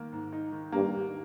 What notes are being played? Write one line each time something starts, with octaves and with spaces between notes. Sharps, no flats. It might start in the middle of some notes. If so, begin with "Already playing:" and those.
Already playing: D#3 A#3 D#4
G#2
D#4
D#3
G2 A#3
G#2